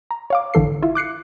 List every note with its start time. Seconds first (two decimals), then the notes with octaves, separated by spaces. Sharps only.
0.11 A#5
0.30 C#5 F5 D6
0.54 A1 D3 E3 A4 C7
0.83 E4 F4 E5
0.95 D6 F#6 C7 C#7